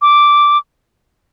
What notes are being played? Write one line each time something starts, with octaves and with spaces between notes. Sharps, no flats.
D6